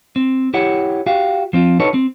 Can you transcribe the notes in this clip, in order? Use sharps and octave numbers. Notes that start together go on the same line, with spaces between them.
C4
E4 G4 C#5 F#5
F#4 G4 F5
F3 C4 F4
D4 D#4 F#4 A4 B4 C#5
C4